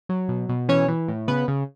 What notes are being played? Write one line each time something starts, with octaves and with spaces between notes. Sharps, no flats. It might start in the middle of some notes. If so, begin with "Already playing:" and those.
F#3
B2
B2
E3 C#4 C#5
E3
A2
C#3 B3 B4
C#3